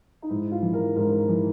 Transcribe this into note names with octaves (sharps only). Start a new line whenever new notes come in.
D#4
G#2 E4
F4
E3
A#4
G#2 A#4
E3